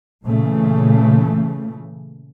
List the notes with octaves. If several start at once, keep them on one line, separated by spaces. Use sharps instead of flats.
A#2 C#3 E3 A3